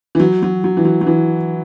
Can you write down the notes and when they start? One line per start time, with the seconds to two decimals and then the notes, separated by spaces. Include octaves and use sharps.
0.15 E3
0.20 F#3
0.42 F#3
0.64 F#3
0.77 E3
0.85 F#3
1.01 F#3
1.07 E3